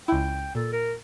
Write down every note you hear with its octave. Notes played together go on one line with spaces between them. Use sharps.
C#2 E4 G5
A#2 A4
A#4